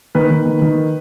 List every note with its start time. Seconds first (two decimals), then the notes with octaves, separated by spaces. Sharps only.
0.15 D#3 B4
0.31 D#3
0.45 D#3
0.62 D#3